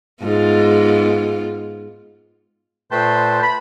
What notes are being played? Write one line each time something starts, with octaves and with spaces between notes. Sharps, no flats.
G#2 B3 F4
A#2 A3 B4 C5 G5 A5
B5